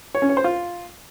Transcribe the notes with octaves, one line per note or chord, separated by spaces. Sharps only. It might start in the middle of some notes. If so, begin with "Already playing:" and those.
C#5
C#4
C#5
C5
F4